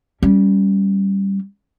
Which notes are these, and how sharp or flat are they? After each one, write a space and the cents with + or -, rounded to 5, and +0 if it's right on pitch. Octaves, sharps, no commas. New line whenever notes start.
G3 +0 C#4 +0